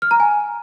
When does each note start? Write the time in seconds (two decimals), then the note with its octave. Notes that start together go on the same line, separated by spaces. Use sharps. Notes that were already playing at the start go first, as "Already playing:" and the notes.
0.02 F6
0.11 A#5
0.20 G#5